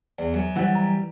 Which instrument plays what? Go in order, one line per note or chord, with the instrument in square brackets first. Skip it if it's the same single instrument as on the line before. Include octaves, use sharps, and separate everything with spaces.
[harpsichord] E2 [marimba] D5
[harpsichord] F#2
[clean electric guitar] E3 G3 [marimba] C5 F#5
[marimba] A#5